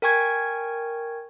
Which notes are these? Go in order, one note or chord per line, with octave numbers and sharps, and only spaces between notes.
A#4 G5 G#5 C#6 G#6